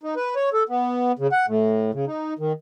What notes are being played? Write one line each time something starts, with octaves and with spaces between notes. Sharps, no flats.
D#4
B4
C#5
A4
B3
C#3
F#5
A2
C#3
D#4
D#3